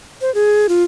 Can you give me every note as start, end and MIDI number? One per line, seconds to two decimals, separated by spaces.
0.21 0.33 72
0.35 0.67 68
0.69 0.83 65